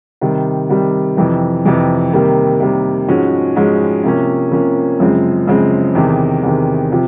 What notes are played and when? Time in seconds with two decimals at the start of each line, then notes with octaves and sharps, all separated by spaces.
0.21 C3 D#3 G3
0.69 C3 D#3 G3
1.17 F2 C3 E3
1.65 F2 C3 E3
2.13 C3 D#3 G3 A#3
2.60 C3 D#3 G3 A#3
3.08 G#2 F3 G#3 C#4 F#4
3.56 G#2 F3 G#3 C#4 F#4
4.04 C3 F3 A#3 C#4
4.52 C3 F3 A#3 C#4
5.00 F#2 C#3 F3 G#3 C4
5.47 F#2 C#3 F3 G#3 C4
5.95 E2 C3 D#3
6.43 E2 C3 D#3
6.92 C3 F3